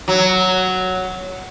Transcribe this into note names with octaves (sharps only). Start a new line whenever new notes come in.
F#3